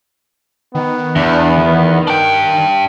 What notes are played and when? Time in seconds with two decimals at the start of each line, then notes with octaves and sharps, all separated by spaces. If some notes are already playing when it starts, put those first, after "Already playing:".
0.75 D#3 B3
1.16 E2 D4
1.58 D#3
2.07 D4 G5